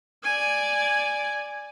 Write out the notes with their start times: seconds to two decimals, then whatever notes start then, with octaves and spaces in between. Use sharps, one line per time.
0.24 D5 G#5